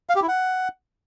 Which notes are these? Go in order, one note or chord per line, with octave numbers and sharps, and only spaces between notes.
F5
G4
E4
F#5